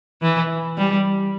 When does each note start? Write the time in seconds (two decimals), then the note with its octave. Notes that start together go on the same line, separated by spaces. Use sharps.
0.22 E3
0.78 G3